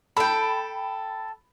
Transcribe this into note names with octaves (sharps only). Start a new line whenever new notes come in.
A4 G5 B5